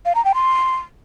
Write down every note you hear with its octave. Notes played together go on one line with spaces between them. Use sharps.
F5
A#5
G5
C6